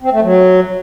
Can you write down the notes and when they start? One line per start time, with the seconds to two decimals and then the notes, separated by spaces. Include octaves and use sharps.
0.02 C4
0.12 A3
0.22 F#3